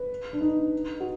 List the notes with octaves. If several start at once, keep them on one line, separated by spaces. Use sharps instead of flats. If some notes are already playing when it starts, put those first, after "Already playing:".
Already playing: B4
D4
D#4
F#4